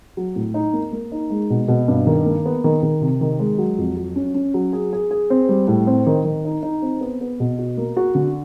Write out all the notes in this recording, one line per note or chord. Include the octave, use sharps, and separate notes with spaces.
F#3
A2
D#4
A#3
A#3
D#4
G#3
B2
B2
G2
D#3
A#3
B3
D#3
D#3
C3
D#3
G#3
F#3
F2
F#3
C#4
C#4
F#3
G#4
G#4
G#4
C4
G3
A2
C4
D#3
D#3
D#4
D#4
C4
B3
B3
B2
F#4
A#3
F#4
D3